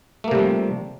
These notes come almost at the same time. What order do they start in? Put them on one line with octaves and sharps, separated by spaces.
A3 A#3 C3 G3 F3